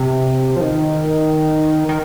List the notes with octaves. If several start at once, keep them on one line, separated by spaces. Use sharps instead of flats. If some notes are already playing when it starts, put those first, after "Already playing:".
Already playing: C3
F3
D#3
D#3